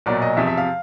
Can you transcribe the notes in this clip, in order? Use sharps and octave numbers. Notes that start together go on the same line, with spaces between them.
B1 A#2 F#3 D5
D#5
E2 C3 F3 E5
E5
F5